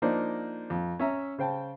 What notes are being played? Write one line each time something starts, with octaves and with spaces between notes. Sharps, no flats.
F3 A#3 D4 D#4 C5
F2
C#4 E5 A#5
C#3 C5 G5 A5